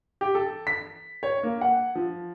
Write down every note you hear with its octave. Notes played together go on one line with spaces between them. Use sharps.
G4
A4
B6
C#5
A#3
F#5
F3